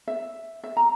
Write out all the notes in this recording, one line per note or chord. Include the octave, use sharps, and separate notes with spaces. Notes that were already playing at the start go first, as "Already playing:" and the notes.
E5
E5
A#5